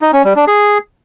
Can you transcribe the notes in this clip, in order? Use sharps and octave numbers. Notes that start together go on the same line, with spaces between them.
D#4
C#4
G3
D4
G#4